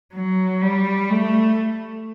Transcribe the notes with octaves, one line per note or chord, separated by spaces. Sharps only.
F#3
G3
A3